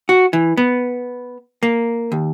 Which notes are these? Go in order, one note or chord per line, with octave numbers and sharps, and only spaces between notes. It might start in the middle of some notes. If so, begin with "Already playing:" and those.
F#4
E3
B3
A#3
D#2